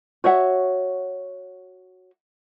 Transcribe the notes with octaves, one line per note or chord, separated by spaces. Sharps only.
F#4 C#5 E5 F#5